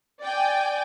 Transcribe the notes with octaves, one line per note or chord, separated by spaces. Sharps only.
D5 G5 G#5